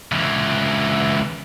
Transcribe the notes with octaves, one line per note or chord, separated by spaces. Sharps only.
C#2 E3